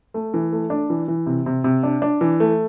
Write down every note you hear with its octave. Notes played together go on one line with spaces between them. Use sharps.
A3
E3
A3
D4
E3
E3
C3
C3
C3
D4
D4
E3
A3